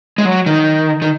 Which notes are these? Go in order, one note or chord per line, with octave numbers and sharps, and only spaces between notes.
G#3
F#3
D#3
D#3